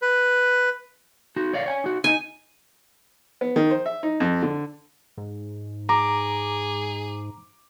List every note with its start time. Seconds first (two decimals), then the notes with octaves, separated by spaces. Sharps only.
0.02 B4
1.36 D#4 F#4
1.53 C#5 D5 F5
1.66 C#5 G5 G#5
1.84 D#4 F#4
2.04 D#4 D#5 G#5
3.41 B3
3.56 D#3
3.71 C5
3.86 E5
4.03 D#4
4.20 F2
4.43 D3
5.18 G#2
5.89 G#4 A#5 D6